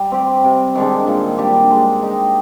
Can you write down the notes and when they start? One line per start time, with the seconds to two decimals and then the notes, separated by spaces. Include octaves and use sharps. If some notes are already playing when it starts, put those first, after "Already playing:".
Already playing: G3
0.12 C4 G4
0.44 C3
0.75 D#3 G#3 D4
1.07 A#2
1.38 G3 D4 G4
1.71 G#3
2.02 D#4 G4